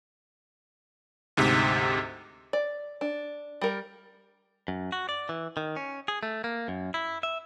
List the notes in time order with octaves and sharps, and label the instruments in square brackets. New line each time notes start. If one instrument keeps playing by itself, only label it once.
[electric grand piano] D2 G#2 C3
[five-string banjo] D5
D4
G3 A#4
[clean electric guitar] F#2
F#4
D5
E3
D#3
C#4
G#4
A3
A#3
F#2
E4
E5